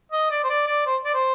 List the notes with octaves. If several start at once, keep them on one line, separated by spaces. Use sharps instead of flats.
D#5
D5
C5
D5
D5
C5
D5
C5